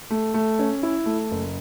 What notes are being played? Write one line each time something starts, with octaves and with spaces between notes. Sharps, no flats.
A3
A3
C#4
E4
A3
F#1